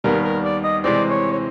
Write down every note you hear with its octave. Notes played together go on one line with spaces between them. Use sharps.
D#2 D#3 G3 B3 A#4
A#4
D5
D#5
C3 E3 G#3 C4 D5
C#5
C#5